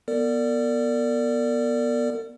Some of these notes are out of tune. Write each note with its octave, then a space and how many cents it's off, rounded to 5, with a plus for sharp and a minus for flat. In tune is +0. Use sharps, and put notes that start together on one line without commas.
B3 -20 A#4 -45 D5 +0